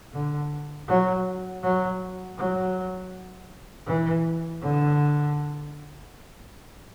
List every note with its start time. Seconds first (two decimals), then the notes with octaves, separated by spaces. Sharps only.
0.13 D3
0.88 F#3
1.63 F#3
2.37 F#3
3.86 E3
4.61 D3